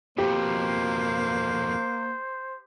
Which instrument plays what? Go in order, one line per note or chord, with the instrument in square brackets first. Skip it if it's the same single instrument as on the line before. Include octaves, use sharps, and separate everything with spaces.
[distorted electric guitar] F2 B2 [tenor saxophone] A#3 [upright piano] G4 [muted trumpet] C5